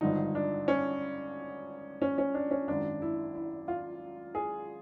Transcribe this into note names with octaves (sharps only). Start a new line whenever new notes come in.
G#1 G2 D3 F3 D#4
D4
C#4
C#4
C#4
D4
C#4
G#1 F#2 D#3 D4
E4
E4
F4
G#4